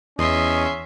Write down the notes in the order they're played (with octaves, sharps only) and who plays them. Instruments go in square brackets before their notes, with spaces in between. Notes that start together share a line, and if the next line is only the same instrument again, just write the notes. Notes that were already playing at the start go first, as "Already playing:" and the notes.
[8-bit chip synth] E2 [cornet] C#4 [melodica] D#5 [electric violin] E5 C6